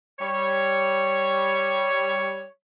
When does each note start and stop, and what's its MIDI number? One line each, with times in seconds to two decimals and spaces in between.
0.19 2.46 55
0.19 2.46 73